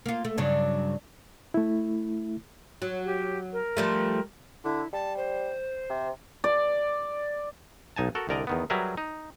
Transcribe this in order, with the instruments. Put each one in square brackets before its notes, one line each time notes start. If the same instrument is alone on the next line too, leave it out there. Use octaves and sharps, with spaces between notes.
[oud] A#3 F4
A3
[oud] G2 C#3 F#3 [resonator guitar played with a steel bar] D4
[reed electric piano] A3 E4
[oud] F#3
[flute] G4
A#4
[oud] F3 G3 A3
[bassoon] D3 [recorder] E4
[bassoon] G3 [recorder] A5
[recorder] C5
[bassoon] C3
[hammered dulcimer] D5
[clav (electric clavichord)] B1 D#4 G#5 A5
F#4 A4 A#4
C2 D3 A#4 D5 D#5 A#5
E2 D#3 B3
F#3 G3 G#4 A#4 B4 E5
D#4